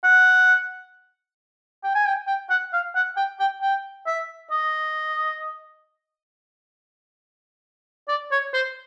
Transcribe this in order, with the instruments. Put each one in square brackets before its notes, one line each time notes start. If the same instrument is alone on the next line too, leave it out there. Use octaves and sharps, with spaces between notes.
[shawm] F#5
G5
G#5
G5
G5
F#5
F5
F#5
G5
G5
G5
E5
D#5
D5
C#5
C5